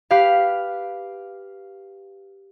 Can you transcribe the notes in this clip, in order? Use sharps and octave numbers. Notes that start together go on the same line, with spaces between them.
G4 B4 F5